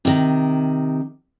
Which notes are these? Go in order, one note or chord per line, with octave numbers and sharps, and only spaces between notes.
C3 D#3